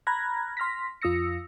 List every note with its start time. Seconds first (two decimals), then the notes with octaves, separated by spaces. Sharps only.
0.07 A#5 B5 F6 F#6 G#6 A#6
0.57 C6 F6 A#6 B6
1.02 F2 F4 D#6 E6 A#6 C#7